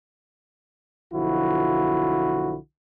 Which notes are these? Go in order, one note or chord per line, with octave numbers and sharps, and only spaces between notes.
B1 D3 F3 E4 F#4